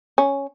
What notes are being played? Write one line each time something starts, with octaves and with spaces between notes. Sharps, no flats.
C#4